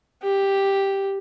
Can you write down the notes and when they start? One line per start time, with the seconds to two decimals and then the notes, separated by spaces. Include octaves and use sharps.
0.23 G4